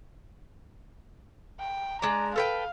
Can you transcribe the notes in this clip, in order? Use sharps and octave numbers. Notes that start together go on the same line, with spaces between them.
G5
G#3 D4 A#5
A4 B4 F5 G5